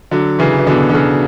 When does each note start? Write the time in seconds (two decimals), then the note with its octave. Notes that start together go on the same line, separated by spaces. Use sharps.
0.11 D3 F#3
0.39 C#3 E3
0.58 E3
0.67 B2 D3
0.90 D3
0.95 C#3